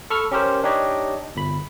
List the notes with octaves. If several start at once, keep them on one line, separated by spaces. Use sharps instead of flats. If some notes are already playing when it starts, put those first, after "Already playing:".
A4 B5 C#6 E6 F6
C#4 G4 A#4 C5
D4 D#4 G4 C#5 D#5
G1 B5